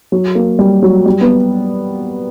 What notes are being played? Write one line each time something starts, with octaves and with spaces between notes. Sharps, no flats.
F#3
A#3
G3
F#3
G3
B3